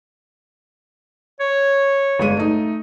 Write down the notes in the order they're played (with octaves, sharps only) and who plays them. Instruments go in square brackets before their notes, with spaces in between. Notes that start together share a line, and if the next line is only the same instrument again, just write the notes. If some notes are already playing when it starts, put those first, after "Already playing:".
[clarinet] C#5
[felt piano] G1 G#3 D#7
A3 D#4